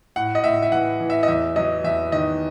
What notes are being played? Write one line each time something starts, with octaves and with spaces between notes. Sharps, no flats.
A2 F#5
D#5
A2 E5
E5
E3 F#5
E3
E5
D#5
E2 E5
F#3 D#5
E2 E5
D#3 D#5